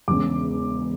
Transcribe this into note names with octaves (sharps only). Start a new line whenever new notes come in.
E1 E2 C#3 D6